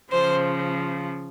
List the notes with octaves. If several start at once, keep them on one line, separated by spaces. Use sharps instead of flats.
C#3 F3 C5